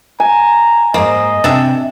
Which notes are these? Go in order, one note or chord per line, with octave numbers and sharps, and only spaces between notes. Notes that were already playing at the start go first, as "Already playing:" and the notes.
G#5 A#5
G#2 A#3 C5 D#5
C3 D4 E5